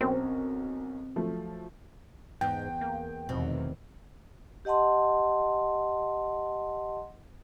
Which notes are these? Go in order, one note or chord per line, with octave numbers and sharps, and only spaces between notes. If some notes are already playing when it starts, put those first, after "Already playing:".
B1 C4 C#4 A#4
F3 F#3 A3
E2 G#2 G5
A#3
F1 E2 B2 D#3 C4
G4 D#5 F#5 A5 C6